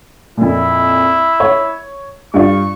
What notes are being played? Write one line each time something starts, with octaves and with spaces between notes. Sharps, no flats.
F2 A#2 E4
C#5
G2 F4 D5 C#6